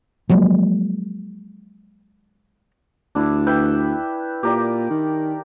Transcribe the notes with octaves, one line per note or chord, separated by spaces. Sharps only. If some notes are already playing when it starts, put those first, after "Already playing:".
F3 F#3 G#3 A#3
D2 D4 E4
B4 E5 G5
A#2 G4 A#4 D5
D#3